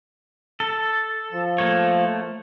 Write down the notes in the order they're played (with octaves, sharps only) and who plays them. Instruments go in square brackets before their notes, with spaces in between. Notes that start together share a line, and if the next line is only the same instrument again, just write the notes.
[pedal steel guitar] A4
[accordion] F3
[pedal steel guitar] A3 A#3 C#5